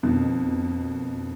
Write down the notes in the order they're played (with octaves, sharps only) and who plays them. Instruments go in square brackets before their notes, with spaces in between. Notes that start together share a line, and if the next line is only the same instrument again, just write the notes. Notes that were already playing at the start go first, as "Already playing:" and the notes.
[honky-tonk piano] F2 B2 D3 D#3